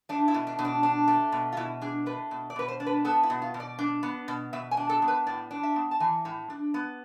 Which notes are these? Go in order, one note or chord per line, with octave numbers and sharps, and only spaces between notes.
A3 D4
E4
B2
D4
B2
D4
D4
A3
B2
F4
B2 E4
D4 G#4
A3 B4
B2
D5
B2 B4
C5
D4
B4
B3 A4
E4
B2
F4
B2
D5
D4
B3
B2
B2 E5
G#5
D4
A4
B3
B4
A2 D5
D4
E5
B3
A5
E3 G#5
A2
D4
B3